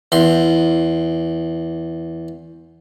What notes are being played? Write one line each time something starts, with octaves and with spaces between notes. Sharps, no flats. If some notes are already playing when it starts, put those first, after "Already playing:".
E2 C6